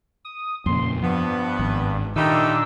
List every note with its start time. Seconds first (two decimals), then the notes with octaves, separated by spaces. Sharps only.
0.24 D#6
0.66 F2 A#2 C#3 C6
1.02 G2 F3 B3
1.59 G#1
2.16 A#2 D#3 G3 A3 D4 D#4 E6